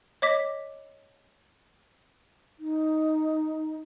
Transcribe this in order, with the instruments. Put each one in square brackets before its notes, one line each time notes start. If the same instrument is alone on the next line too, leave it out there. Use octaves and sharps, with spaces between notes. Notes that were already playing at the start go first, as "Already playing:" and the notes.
[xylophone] C#5 D#5 D6 B6
[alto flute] D#4